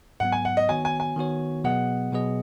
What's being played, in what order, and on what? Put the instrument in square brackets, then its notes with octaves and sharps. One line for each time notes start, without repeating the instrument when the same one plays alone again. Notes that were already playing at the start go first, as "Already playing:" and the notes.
[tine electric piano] G#2 F#3 B3 [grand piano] F#5
[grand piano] G#5
F#5
D#5
[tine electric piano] D#3 B3 F#4 C#5 [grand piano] G#5
[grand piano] G#5
G#5
[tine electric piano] D#3 B3 F#4 C#5
[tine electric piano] B2 F#3 B3 G#4 D#5 [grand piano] F#5
[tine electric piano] B2 F#3 B3 G#4 D#5